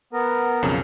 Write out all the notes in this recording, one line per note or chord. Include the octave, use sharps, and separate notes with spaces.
B3 A#4
B1 F2 C#3